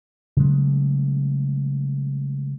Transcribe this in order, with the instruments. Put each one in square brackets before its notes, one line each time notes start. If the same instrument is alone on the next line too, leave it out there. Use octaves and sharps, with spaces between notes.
[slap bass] C#3 F#3 G#3 A3